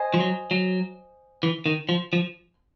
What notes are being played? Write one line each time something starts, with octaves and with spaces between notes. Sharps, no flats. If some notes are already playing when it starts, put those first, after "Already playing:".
Already playing: C5 D#5 G#5
F3
F#3
F#3
E3
D#3
F3
F3